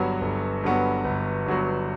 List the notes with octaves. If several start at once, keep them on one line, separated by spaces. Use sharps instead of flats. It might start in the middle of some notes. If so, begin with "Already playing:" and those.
Already playing: G1 G2 F#3 B3 F#4
G1
G2 F#3 B3 F#4
G1
G2 F#3 B3 F#4